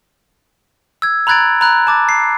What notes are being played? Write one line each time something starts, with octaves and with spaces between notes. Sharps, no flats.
E6 G#6
A#5 B5 F#6 G#6 A6 D7
A#5 B5 F#6
A5 D6 A6
C7